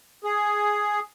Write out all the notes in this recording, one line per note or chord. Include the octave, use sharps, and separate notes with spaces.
G#4